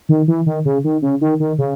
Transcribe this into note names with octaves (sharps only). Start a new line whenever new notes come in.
D#3
E3
D#3
C#3
D#3
C#3
D#3
D#3
C#3